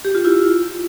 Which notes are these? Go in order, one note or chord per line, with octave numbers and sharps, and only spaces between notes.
G4
F4
E4